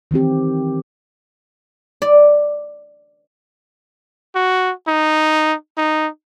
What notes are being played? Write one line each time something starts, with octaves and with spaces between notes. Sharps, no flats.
D#3 E3 C4 G4
D5
F#4
D#4
D#4